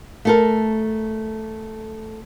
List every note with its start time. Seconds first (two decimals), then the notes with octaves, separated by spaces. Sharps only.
0.25 A3 A4 A#4